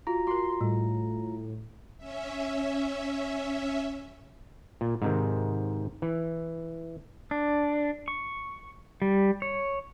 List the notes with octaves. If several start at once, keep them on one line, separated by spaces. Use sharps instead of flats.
F4 F#4 A#5
F#4 A#4 C6
A2 G3
C#4 E5
A#2
G#2 C3 D#3
E3
D4
C#6
G3
C#5